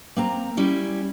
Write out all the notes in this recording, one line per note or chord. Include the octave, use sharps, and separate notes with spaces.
A#3 C4 A#5
G3 C#4 E4